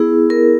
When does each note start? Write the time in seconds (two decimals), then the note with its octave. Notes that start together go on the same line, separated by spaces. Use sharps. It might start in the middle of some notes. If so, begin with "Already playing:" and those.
Already playing: B3 E4 G#4
0.30 A#4